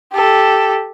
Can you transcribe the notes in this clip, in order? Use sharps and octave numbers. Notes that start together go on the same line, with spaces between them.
G4 A4